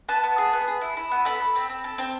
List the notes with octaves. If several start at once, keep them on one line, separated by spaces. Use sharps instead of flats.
B3 A5
B3
G#4
B3
G#4
E4
E4
B3
A4 B5
A4
C4
C4
A4
C4